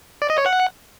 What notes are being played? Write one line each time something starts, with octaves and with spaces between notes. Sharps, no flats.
D5
D#5
C#5
F#5